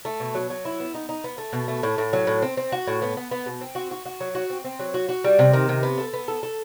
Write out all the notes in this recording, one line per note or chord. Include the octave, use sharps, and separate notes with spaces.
A3
B2
F#3
F#3
E4
B3
D#4
D#4
B3
A3
B2
A3
A2
A2
F#3
A2
C4
C4
F#4
A2
B3
B3
B3
B2
C4
F#4
F#4
F#4
F#3
F#4
C4
C4
F#3
F#4
F#4
G3
C3
D#3
C3
B3
A4
B3
A4
A4